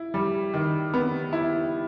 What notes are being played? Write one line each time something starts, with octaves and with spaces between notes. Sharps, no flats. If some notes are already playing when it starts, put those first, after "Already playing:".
Already playing: E4
G3
D#3
B3
E4